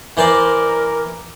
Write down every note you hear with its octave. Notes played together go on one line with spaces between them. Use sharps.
E3 A#4 C5 D5